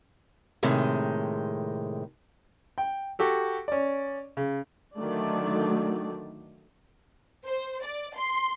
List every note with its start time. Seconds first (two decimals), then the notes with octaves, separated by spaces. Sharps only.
0.63 A2 C3 D#3 G#3
2.78 G5
3.19 F#4 G4 A4
3.68 C#4 D5
4.37 C#3
4.96 D3 D#3 F#3 A3 D5
7.46 C5
7.83 D5
8.16 C6